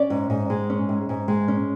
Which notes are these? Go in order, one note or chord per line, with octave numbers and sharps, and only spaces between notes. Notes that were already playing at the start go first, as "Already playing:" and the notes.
Already playing: C#4 D5
G#2
G#2
G#3
C#4
G#2
G#2
G#3
C#4